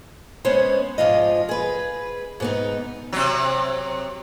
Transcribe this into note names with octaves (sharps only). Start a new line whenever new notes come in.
G#3 B3 C#4 C5 C#5
G#2 F3 F4 D#5
G#4 B4
G#2 B3 D#4
C3 F#3